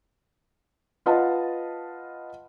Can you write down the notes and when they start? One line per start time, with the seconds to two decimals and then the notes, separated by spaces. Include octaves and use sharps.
1.06 F4 B4 D#5 F5 F#5 A5